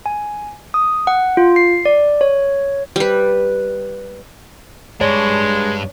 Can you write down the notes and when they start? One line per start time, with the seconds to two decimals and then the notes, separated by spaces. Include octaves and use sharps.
0.06 G#5
0.74 D#6
1.07 F#5
1.37 F4
1.56 C7
1.85 D5
2.21 C#5
2.96 G3 B4
5.01 G2 G#3 D4 C#5 D5